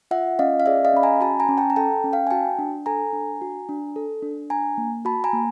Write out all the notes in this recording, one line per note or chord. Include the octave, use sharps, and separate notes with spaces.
F4 E5 F#5
C#4 D#5 F5
F5
G#4 D5 E5
D#5 F5
C#4 B5
G#5 A#5
F#4 A5 B5
G#5 A#5
C#4
G5 A5
A#5
A4 G5 A5
C#4
F5 G5
G#5
F#4 G5 A5
D4
A4 G#5 A#5
D4
F#4
D4
A4
D4
D4 G#5 A#5
A#3
F#4 A5 B5
G#5 A#5
A#3